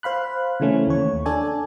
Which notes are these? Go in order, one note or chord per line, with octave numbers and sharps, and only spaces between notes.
C5 F5 B5 F#6
C#3 E3 A3 C#4
D#2 C#5
D4 A4 D5 G#5